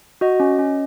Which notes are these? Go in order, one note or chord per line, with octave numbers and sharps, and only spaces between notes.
F#4 D#5
C#4
C#4